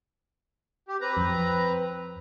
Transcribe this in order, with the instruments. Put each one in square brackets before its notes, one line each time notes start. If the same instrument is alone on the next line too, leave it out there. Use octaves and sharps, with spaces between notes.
[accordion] G4
C4 B4 A#5
[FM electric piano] F2